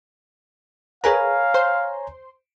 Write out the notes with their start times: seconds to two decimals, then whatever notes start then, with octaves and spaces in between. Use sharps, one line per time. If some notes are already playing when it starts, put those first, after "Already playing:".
1.04 G#4 A#4 B4 C#5 F5 G#5 A#5
1.54 C5 C6